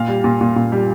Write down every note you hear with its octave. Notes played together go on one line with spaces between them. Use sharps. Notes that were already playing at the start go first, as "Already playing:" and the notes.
Already playing: A#2 F5
G3
A#2
A#2
A#2
G3